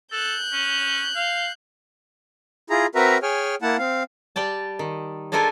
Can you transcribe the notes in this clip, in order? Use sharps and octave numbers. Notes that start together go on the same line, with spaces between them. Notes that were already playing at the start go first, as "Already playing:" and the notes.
A4 F#6 G6
C#4
F5
E4 F4 G#4 A#5
C4 F#4 A#4 B4 E5 A#5
G#4 C#5 G5 G#5 F6
A#3 E4 F#5 A5
C4 F5
G3 D5 G5 A5
D#3
G#3 D4 F4 A4 A#4 G#5